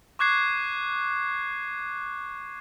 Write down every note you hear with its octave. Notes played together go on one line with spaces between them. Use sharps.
C#6 D6 F#6 G#6 C7